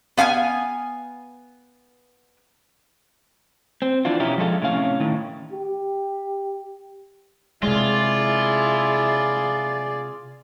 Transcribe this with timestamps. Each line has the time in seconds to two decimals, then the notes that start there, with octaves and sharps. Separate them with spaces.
0.17 B3 F5 F#5 G#5
3.82 C4
4.05 E3 D4 F4
4.20 B2 C#4 D#4 E4 G4
4.38 F3 G#3 A4 F5
4.62 A2 C3 C#4 F5
5.00 A2 D#3
5.53 G4
7.63 C3 G#3 E4 F4 G#4 D5